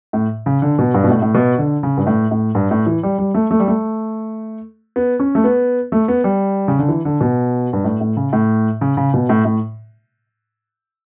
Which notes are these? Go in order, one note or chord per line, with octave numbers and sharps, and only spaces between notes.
A2
C#3
D3
B2
G2
B2
A2
A2
B2
D3
C#3
G2
A2
A2
G2
A2
E3
G3
G3
A3
A3
G3
A3
B3
C#4
A3
B3
A3
B3
G3
C#3
D3
E3
D3
B2
G2
A2
A2
C#3
A2
C#3
C#3
B2
A2
A2